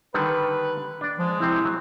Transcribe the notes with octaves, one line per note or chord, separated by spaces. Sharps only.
D3 D#3 G3 B4
D4 D5
F3 G#3
C3 C4 E4
F#3